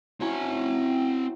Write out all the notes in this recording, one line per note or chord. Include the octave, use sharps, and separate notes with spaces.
F#3 C4 C#4 E4 G#5